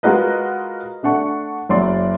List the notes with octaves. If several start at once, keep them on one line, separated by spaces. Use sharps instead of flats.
G#3 F4 F#4 A#4 B4 D#5
A3 D4 F#5 C#6
F#1 F#3 D5 C6